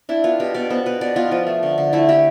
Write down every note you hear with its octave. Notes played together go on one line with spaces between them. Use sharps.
D4 E4
B3 F4
B2 G4
B2 D5
B3 C5
B2 B4
B2 D5
B3 F4
F3 F4
A3
D3
D3
A3 E4
A3 G4